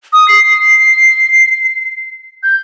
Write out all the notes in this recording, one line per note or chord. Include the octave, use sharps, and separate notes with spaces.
D#6
C7
G6